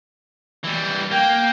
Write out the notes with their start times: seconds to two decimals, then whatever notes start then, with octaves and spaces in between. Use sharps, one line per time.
0.64 E3 G3
1.11 A#3 G5